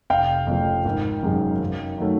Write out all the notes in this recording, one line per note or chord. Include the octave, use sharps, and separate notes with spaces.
F1 F5 G5
F2 C#3 F3 A3
G#1
F#2 D#3 G#3
F#2
D#3 F#3 A3